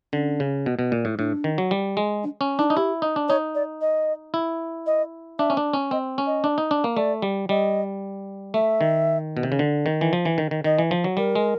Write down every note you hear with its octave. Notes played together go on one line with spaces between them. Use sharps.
D3 C#4
C#3
B2
B2
A#2
A2
A2 D4
D#3
F#3
G3
G#3
D4
C#4
D4 D#4
D#4
E4 G4
D#4
D4
D#4 C#5
D5
D#5
E4
D#5
D4 E5
C#4
D4
C#4
C4 D#5
C#4
D#5
D4
D#4
D4
A#3
A3 D5
G3
G3 D#5
A3 E5
D#3
B2
C3
C#3
D3
D#3
E3
F3
E3
D#3
D#3
D#3 D#5
E3
F3
F#3
G3 A#4
G#3